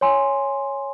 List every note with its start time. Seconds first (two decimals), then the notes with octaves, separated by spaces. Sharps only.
0.01 C#5 G#5 C6